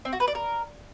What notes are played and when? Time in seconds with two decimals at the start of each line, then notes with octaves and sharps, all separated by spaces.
0.05 C4
0.13 F#4
0.20 B4
0.27 D5
0.35 A#4